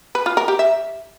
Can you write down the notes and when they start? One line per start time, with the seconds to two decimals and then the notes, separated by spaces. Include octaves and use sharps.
0.15 B4
0.26 F4
0.37 A#4
0.48 G4
0.59 E5